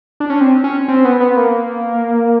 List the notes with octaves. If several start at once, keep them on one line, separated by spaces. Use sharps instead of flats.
D4
C#4
C4
C#4
C4
B3
B3
A#3